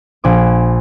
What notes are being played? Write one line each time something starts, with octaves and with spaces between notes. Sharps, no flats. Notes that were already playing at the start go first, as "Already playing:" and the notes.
A#1 G#5 D6